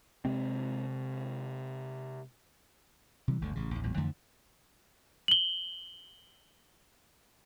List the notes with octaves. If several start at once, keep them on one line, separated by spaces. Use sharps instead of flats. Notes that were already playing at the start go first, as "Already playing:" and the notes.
C3 G#3 C4
C3 E3 G3
G1 D2 D3
A1 C#3
A1 D#2
A1 E2 A#2 G3
F2 D3 E3 A3
F#7 G7